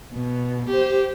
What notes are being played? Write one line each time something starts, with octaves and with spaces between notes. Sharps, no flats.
B2
G4 C5